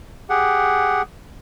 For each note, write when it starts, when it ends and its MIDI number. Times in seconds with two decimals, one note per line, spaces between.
0.30 1.02 67
0.30 1.02 68
0.30 1.02 78